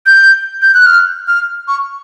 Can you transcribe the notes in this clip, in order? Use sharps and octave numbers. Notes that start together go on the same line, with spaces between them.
G6
G6
F#6
F6
F6
C#6